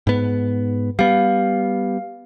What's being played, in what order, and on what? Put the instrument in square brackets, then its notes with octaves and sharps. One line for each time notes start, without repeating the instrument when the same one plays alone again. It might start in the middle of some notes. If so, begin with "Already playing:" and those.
[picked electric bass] G#2 B3
[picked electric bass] G3 B3 [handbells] F5